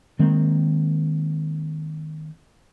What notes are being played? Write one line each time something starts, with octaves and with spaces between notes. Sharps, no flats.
D#3 G#3 A#3 C4